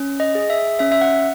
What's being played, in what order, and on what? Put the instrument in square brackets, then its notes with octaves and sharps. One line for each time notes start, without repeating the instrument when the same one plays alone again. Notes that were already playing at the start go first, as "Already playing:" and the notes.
Already playing: [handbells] C#4
D#5
G#4
E5
C#4 E5
E5
F#5